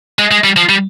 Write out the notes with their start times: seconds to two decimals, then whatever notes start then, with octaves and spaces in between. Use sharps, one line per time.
0.19 G#3
0.31 G#3
0.44 G3
0.56 F3
0.69 G3